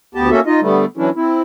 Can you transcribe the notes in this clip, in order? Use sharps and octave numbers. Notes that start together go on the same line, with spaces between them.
D2 B3 G4 A5
A#3 C#4 F#4 A4 E5
D#4 F4 D#5
D3 G3 A3 B3
E3 F#3 C#4 D4 E4
C4 E4